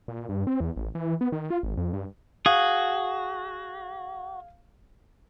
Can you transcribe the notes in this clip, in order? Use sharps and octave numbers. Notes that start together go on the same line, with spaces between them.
A#2
G2
C4
E2
A1
E3
B3
D#3
F4
G#1
F2
G2
F#4 G#4 F5